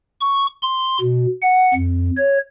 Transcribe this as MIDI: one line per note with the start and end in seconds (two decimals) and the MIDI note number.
0.21 0.47 85
0.63 0.98 84
1.01 1.26 47
1.42 1.73 78
1.74 2.10 41
2.17 2.38 73